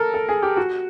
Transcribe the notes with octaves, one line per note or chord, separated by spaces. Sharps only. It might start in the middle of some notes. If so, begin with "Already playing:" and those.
Already playing: A4 A#4
A4
G#4
G4
F#4